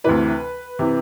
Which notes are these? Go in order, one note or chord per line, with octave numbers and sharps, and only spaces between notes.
D2 C3 E3 B4
C3 E3